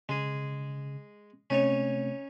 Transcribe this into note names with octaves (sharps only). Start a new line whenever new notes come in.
C#3 G#3 G#4
C3 A3 C4 C#4 D#4 C#5